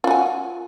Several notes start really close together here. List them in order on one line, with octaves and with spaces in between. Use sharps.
F4 F#4 G#5